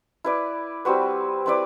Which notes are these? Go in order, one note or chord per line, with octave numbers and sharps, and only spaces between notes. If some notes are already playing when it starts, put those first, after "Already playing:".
E4 B4 D5
G3 C4 F#4 B4
C4 E4 B4 D5